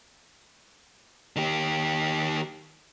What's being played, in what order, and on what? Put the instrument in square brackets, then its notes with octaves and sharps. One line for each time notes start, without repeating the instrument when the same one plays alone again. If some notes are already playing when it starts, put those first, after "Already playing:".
[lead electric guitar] D#3 G4